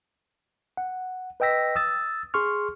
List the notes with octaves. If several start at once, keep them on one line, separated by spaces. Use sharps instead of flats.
F#5
B4 D#5 G5 E6 A#6 B6
D#6 E6 A6
G#4 C6 C#6 F6